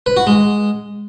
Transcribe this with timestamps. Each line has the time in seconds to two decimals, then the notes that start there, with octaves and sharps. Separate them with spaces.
0.06 B4
0.17 F#4
0.27 G#3